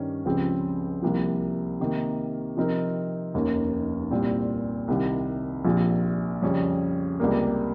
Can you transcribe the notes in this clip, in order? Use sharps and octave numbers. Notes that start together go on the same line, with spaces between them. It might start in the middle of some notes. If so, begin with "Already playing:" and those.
Already playing: G2 D#3 G3 C#4
C#2 C#3 F3 C4 G4
C2 C3 F3 A#3
C3 D#3 A#3
C3 F3 C4 D#4 A#4
F1 D#2 D#3 A#3 C#4
C2 A#2 G3 C4
C2 C3 D#3
A#1 A#2 F3 C4 G4
F2 C#3 G3 C#4
C#2 C3 G3 A#3